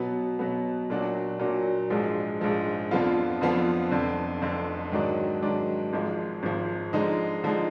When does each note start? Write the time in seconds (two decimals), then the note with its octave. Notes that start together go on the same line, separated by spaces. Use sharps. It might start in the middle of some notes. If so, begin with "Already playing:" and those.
Already playing: B2 F#3 B3
0.39 B2 F#3 B3
0.90 A#2 F#3 D4 F#4
1.39 A#2 F#3 D4 F#4
1.90 A#1 G#2 F3 G#3
2.40 A#1 G#2 F3 G#3
2.91 F2 D3 F3 B3 F4
3.41 F2 D3 F3 B3 F4
3.91 F1 F2 D3
4.42 F1 F2 D3
4.92 G#2 D#3 F#3 D4
5.42 G#2 D#3 F#3 D4
5.93 G#1 G#2 F3 G#3
6.43 G#1 G#2 F3 G#3
6.93 D3 F3 G#3 D#4
7.44 D3 F3 G#3 D#4